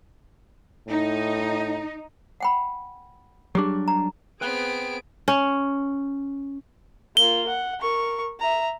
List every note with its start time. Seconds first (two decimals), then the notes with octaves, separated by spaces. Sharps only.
0.87 A2 D#4
2.40 F#5 G5 B5
3.55 F#3 G3 D4 G4 G#4
3.88 A#5
4.41 B3 C4 G#4 B4 G5 F#6 D7
5.28 C#4
7.17 A#3 F4 G7
7.48 F#5
7.80 A#4 C#6
8.40 E5 A#5